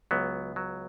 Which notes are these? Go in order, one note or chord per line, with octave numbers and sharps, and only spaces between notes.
C#2 F#3 B3
F#3